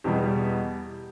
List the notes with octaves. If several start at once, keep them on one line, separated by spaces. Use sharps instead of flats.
E2 B2 G3 G4